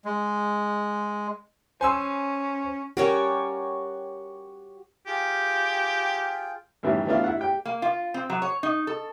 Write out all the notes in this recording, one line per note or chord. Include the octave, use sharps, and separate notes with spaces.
G#3
C#4 C5 G#5 C6 E6
C#4 F#4 G4 A#4 C#5 D5
F4 G4 G#4 G5
F#2 A2 D#3 E3 F#3 G3
F#3 A3 B3 D4 E4 F4
E4 E5 F#5
G4 G5
A#3
F4
C4
F#3
C#5
D#4
A4